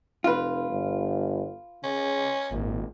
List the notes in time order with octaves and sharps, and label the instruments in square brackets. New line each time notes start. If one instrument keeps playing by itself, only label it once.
[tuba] F1 [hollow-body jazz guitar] F4 B4
[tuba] G1
[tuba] C#3 [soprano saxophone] C#4
[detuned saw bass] G#1 [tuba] A#2